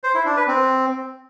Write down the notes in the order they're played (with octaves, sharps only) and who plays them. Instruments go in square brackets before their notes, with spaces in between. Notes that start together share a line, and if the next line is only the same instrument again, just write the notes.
[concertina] C5
E4
D4
B4
C4